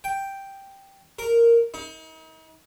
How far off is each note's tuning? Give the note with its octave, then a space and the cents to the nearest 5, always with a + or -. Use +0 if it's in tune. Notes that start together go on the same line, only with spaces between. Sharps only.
G5 +0
A#4 -5
D#4 +40